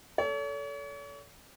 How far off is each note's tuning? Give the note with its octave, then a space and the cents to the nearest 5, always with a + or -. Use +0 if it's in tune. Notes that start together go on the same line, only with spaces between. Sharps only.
A4 +0 C#5 +40